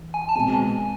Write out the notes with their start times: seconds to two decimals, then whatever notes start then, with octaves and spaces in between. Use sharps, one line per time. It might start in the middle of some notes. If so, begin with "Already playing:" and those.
Already playing: E3
0.14 G#5
0.29 A5
0.35 B2 G#3 C4 G#5